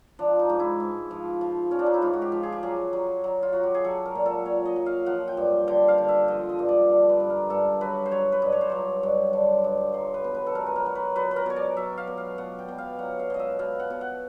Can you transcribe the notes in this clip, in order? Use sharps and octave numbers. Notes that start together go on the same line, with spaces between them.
F3 D4
D#4
G#2
E4
G#2
F3
F3
F3 C#4
D4
D#4
E4
G#2 F4
F#4
G4
F3
G#4
G4
F#3 G#4
F#3
F#3
F4
F#3 F#4
G4
G#4
F#3 A4
A#4
A#2
A4
A#2 C#5
D#5
F#3
F5
F3 F#5
G5
G2
D3 G5
F5
D3
E5
F3 D#5
D#5
G2
D5
D3
B4
G2
A#4
G2 A4
F#3 B4
C5
F#3 C#5
B4
G2
C#5
C5
F#3 C#5
G2
D3
G2
F#3 C5
B4
B2
B4
A4
F#3 A#4
B4
A#4
F#3
B4
F#3 B4
B4
A#4
B2 C#5
D5
F#3 E5
F5
B2
F5
B2 F#5
G5
B2
F5
F#3 F#5
F5
B2 D#5
E5
B2 F5
F#5
B2
F#5